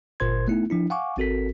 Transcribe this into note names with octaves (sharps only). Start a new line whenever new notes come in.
G1 A#2 A#4 C5 C6 G#6
A3 B3 D#4 E4
F3 D4 E4
F5 F#5 G#5 C#6 D6
G#1 C4 F#4 A4 A#4 B6